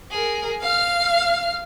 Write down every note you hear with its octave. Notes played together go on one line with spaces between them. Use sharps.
G#4 A#4
F5 F6